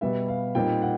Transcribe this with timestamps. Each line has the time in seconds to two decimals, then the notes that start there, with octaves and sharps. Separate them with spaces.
0.01 B2 G3 B3 E5
0.28 F5
0.55 A#2 G3 C4 D#4 G5
0.82 F#5